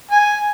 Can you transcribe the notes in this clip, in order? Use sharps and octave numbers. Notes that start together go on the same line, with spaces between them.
G#5